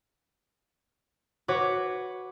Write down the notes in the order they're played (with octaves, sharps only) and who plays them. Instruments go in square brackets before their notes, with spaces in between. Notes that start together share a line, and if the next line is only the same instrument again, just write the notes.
[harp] F#4 B4 C#5 D6